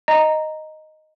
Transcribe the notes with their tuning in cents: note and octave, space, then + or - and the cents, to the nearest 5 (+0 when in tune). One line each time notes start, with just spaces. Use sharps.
D#5 +0 A#5 +0